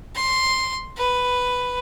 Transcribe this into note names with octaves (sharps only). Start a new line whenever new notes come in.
C6
B4